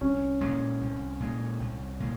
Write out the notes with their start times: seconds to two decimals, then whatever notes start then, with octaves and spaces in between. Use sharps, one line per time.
0.01 C2 C#4
0.41 A#2 G#3
0.81 C2
1.20 A#2 G#3
1.60 C2
2.00 A#2 G#3